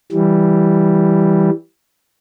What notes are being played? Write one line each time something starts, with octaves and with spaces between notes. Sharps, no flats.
E3 G3